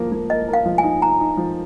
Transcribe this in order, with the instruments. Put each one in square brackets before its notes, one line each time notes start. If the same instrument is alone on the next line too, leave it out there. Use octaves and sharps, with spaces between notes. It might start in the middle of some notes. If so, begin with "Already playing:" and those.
Already playing: [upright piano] F3 A#3
A#3
[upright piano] A#4 [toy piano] D#5
[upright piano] A#4
[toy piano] F5
[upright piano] F3
[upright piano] D#4 [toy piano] G#5
[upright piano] D#4 [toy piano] A#5
[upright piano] D#4
F3